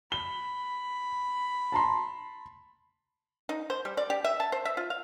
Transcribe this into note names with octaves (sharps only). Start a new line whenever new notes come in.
B5 G7
A5 A#5 C6
D#4
C5
G3
D5
G4
E5
A5
C5
E5
F4
F5